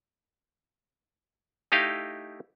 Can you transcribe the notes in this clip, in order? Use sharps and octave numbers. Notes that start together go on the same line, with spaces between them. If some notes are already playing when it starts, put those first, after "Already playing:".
A3 D#4 E4 G4 D#5 F5